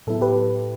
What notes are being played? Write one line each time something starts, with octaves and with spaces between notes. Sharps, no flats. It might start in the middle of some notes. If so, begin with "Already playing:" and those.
A2 F#3 B3 E4 A4
G4 B4